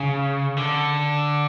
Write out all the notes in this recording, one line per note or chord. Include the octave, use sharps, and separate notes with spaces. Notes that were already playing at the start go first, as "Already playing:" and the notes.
Already playing: C#3
D3